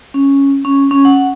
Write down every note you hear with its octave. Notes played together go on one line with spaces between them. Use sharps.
C#4
C#4
C#4
F#5